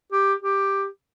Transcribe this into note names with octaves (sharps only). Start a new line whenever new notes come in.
G4
G4